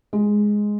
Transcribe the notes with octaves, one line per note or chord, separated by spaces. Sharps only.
G#3